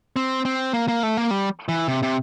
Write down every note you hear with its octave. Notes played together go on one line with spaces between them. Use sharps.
C4
C4
A#3
A#3
A3
A#3
G3
E3
C3
C3